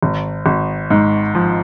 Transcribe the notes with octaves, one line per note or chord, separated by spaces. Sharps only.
G#1
G#1
G#2
F3